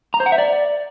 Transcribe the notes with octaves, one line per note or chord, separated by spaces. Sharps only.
A#5
C5
F#5
E5
D5